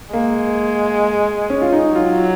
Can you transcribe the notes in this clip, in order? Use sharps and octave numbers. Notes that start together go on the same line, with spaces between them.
G#3 A#3
C#4
F4
D#4
F#3 F4